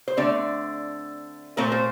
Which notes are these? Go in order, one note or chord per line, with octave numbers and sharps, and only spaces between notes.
C5
D3 A3 C4 D5
A#2 A3 C4 A#4
C5